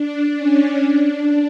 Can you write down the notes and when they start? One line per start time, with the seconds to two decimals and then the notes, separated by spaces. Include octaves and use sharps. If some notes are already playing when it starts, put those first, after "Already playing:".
Already playing: D4
0.37 C#4
0.81 D4